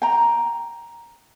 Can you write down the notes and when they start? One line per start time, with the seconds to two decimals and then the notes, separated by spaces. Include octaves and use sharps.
0.02 G5 A#5